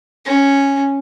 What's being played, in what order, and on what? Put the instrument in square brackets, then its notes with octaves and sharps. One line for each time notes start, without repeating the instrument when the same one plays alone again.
[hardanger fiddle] C#4